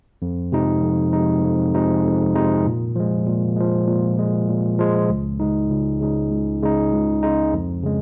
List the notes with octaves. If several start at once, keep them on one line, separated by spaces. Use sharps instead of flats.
F2
C3 F3 G#3 D#4
F2
C3 F3 G#3 D#4
F2
C3 F3 G#3 D#4
F2
C3 F3 G#3 D#4
A#2
F3 G#3
A#2
F3 G#3
A#2
F3 G#3
A#2
F3 G#3
C#2
C#3 G#3 D#4
C#2
C#3 G#3 D#4
C#2
C#3 G#3 D#4
C#2
C#3 G#3 D#4
F2
C#3 G#3